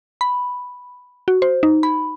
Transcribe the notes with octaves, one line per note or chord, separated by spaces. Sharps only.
B5
F#4
C5
D#4
B5